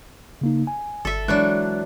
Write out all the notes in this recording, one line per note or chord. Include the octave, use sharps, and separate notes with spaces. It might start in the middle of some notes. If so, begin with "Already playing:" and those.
C#3 A#3 D#4
G#5
G1 A4 E5
E3 F#3 G#3 D4 F#6